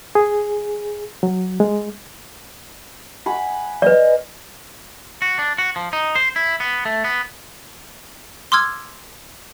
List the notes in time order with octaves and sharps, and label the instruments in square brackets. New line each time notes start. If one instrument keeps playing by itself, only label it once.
[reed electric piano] G#4
F#3
G#3
[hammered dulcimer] F#5 G#5 B5
[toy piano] B4 D5 [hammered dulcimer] D#5
[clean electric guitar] F#4
D4
F#4
F3
D#4
C5
E4
B3
A3
B3
[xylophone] C6 D6 E6 F6 G#6